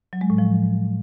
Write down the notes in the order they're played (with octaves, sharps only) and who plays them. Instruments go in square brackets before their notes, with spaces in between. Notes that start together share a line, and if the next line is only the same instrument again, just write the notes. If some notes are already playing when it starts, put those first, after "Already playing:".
[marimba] F#3
G#3
A2
F3